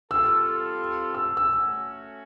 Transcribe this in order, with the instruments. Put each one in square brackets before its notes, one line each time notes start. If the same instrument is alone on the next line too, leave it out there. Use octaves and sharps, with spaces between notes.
[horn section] G3 C4 F4 A4 [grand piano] E6
[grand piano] E6
E6
[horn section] A3 C#4 F#4